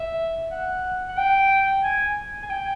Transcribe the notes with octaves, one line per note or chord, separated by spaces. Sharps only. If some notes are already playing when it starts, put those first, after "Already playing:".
Already playing: E5
F#5
F#5
G5
G#5
G#5
G5